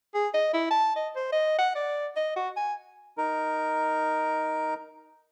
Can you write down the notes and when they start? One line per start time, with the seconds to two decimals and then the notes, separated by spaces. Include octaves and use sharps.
0.14 G#4
0.34 D#5
0.53 E4
0.70 A5
0.96 D#5
1.16 C5
1.32 D#5
1.59 F#5
1.75 D5
2.16 D#5
2.36 F#4
2.56 G#5
3.18 D#4 A#4